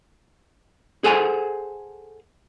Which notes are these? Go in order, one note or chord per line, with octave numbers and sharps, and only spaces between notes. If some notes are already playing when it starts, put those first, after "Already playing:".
G#4 A4 C5 F#5 G#5